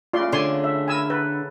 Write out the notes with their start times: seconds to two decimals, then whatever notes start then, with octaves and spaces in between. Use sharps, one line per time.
0.13 C#3 A3 F4 D5 C6
0.32 D3 D5 G#5 C6
0.64 E5
0.88 E4 A#4 G#5 E6
1.10 A4 B4